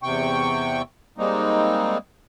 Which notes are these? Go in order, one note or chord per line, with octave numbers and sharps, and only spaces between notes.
E2 C3 G5 C#6
G3 G#3 A#3 C4 D#4